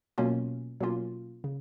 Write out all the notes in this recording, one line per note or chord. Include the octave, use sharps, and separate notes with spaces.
B2 F#3 A#3 C#4 F4
B2 F#3 A#3 C#4 F4
C#3